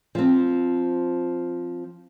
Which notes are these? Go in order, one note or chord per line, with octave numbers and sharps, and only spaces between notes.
F3 C4